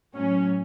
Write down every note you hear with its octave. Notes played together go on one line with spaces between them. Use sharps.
A2 F#3 C#4